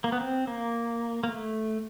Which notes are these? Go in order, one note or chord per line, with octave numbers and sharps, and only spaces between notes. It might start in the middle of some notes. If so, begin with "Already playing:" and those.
A#3
B3
C4
A#3
A#3
A3